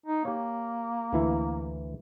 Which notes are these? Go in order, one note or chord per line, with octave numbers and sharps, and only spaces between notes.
D#4
A#3 G4 C#5
D2 E3 E4